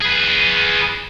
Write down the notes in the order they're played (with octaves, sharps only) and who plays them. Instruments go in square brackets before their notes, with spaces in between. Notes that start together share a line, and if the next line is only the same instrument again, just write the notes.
[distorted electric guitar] G#4 B4